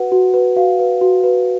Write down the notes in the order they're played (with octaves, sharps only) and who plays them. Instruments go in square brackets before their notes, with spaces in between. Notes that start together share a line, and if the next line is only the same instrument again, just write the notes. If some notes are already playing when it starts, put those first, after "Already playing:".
Already playing: [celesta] F#4 B4 F#5
F#4
B4
F#4 F5
B4
F#4
B4